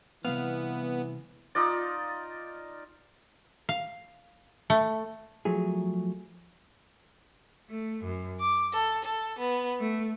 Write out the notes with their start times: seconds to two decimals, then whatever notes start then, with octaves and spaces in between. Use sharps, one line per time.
0.25 C2 G2 E3 B3 F5
1.55 D#4 F4 D5
3.69 F5
4.70 A3
5.45 F3 F#3 A3 G#4
7.69 A3
8.05 F#2
8.39 D6
8.72 A4
9.05 A4
9.39 B3
9.80 A3